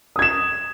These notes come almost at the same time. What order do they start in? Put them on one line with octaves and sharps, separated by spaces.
D#6 G#6 E7